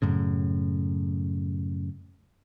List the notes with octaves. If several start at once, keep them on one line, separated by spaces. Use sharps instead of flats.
F#2 A2 C#3